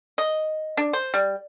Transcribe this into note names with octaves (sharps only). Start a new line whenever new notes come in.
D#5
D4
C5
G3